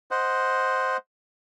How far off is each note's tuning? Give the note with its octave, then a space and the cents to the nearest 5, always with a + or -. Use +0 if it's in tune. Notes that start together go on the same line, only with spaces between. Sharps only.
C5 +0 D#5 +0 F#5 +0